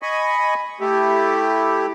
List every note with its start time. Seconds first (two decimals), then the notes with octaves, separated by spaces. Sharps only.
0.02 D#5 G#5 B5 C#6
0.80 A3 E4 G4